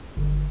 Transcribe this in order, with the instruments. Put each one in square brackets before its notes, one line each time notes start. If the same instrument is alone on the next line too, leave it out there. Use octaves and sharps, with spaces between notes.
[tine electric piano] G1